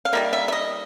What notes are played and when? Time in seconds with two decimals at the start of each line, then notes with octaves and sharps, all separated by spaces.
0.05 F5
0.13 D#3 G3 A#3 E5
0.33 E5
0.48 E5
0.52 D#5